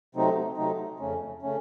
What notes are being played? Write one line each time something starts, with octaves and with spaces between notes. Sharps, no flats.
C3 F#3 A3 C4 D#4
C3 F#3 A3 C4 D#4
F2 C#3 A3 C#4
C#3 A3 C#4